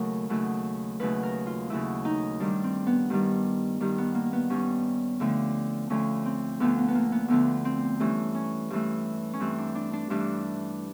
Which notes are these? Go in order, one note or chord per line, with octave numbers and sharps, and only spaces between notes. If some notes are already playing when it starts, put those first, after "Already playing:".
Already playing: D#2 C#3 F#3 A3 A#4
D#2 C#3 F#3 A3
D#2 C#3 F#3 A3 B4
A#4
F4
D#2 C#3 F#3 A3 E4
D#4
G2 D#3 G3 D4
C4
B3
G2 D#3 G3
G2 D#3 G3
B3
A#3
B3
G2 D#3 G3 C#4
D2 D3 F3 A3
D2 D3 F3 A3 C#4
C4
D2 D3 F3 A3 B3
B3
B3
A#3
B3
D2 D3 F3 A3 B3
C4
G2 E3 A3 C#4
C#4
G2 E3 A3
C#4
G2 E3 A3 C4
D4
D4
D4
G2 E3 A3 D4